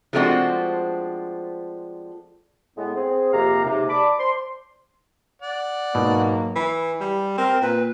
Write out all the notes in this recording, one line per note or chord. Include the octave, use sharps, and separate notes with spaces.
F3 G#3 A3 C4 D4 F#4
A2 G#3 B3
C4 G#4
F2 C3 A#3 G4 F5 A#5
D#2 G#2 C3
D5 A5 B5 D6
C5 D5 C6
D5 F#5
G#2 B2 F#3 A#3 D#4
E3
G3
C4 A#4
A#2 B4